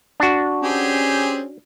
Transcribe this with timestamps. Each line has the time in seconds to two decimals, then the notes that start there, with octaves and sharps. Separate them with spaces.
0.20 D4 F#4
0.63 C4 C#4 G4 G#4